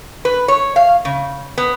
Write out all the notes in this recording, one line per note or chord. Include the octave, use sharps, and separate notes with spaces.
B4
C#5
F5
C#3
B3